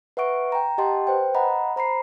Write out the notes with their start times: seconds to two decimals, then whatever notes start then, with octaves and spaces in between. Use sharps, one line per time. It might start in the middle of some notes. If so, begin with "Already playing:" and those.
0.17 B4 E5 F#5 C#6 D7
0.52 G5 A#5
0.78 G4 D#5 F#5 G5 A5 C6
1.07 B4 C5 G5
1.34 D#5 F#5 A#5 B5
1.76 C5 A#5 B5 C7